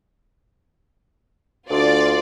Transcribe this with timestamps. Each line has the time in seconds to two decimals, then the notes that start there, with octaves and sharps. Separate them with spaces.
1.70 D2 F4 D5